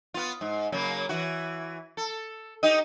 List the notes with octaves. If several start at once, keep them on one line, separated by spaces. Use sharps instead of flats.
B3 F4
G#2
C#3 F#3 A#3
E3 F#4
A4
D#4 G4 D#5